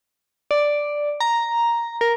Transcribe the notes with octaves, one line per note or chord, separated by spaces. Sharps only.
D5
A#5
A#4